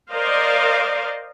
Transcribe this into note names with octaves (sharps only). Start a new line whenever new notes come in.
A#4 C5 D5 D#5 F5